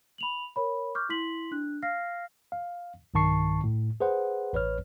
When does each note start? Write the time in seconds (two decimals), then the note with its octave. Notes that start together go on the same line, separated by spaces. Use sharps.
0.18 B5 F7 F#7
0.56 A#4 C#5 B5
0.95 C#6 D6 F6 G6
1.09 E4 C6 B6 F#7
1.51 D4 F#6
1.82 F5 F6 A#6 C7
2.52 F5
3.14 B1 G2 D#3 A5 C#6 C7
3.64 A2
4.00 G#4 B4 C5 F#5
4.53 A1 B4 C#5 F6